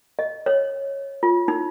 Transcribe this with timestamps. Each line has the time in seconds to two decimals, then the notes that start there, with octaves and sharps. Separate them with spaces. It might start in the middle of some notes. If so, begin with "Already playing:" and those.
0.19 D#5
0.46 C#5
1.23 F4
1.48 D#4